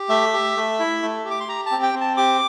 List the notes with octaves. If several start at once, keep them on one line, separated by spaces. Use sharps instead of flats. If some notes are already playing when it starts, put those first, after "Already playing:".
Already playing: G4
A3 E5
G4
A3
E4
A3
G4
D6
C6
G4 A#5
A5
C4
G5
C4
A5
G4 D6